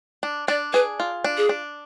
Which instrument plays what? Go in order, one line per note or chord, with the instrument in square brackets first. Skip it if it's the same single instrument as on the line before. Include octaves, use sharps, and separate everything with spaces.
[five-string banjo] D4
[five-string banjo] D4 [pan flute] D5
[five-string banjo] G#4 [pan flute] B4
[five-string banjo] F4
D4
[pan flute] G#4
[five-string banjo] D4